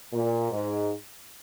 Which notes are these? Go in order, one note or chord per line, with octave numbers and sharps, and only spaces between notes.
A#2
G#2